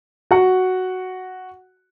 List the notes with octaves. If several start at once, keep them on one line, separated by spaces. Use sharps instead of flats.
F#4 F#5